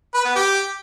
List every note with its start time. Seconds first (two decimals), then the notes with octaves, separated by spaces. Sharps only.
0.14 B4
0.25 B3
0.35 G4